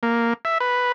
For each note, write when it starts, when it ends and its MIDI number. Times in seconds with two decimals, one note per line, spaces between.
0.03 0.33 58
0.45 0.58 76
0.60 0.92 71